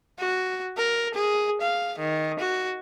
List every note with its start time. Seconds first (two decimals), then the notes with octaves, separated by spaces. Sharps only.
0.19 F#4
0.77 A#4
1.15 G#4
1.62 F5
1.99 D#3
2.40 F#4